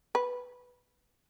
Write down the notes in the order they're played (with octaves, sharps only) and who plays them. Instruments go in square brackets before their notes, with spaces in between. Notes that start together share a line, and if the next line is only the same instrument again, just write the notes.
[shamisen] B4